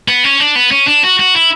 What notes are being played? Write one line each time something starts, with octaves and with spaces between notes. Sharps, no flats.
B3
C#4
D4
B3
C#4
D4
F#4
F#4
E4